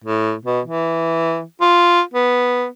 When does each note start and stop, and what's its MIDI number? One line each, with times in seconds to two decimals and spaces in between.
0.04 0.33 45
0.45 0.60 47
0.65 1.42 52
1.61 2.01 65
2.13 2.66 59